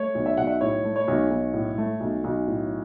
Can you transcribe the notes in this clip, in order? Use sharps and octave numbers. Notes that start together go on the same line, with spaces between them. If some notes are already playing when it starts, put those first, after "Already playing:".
Already playing: A3 C#5
B1
E5
B1 F#5
E5
A2 C#5
A3
C#5
B1
B1
A2
A3
B1
B1
A2